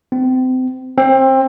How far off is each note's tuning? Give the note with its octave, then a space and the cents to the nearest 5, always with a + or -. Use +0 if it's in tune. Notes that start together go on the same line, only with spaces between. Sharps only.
C4 -30
C4 +25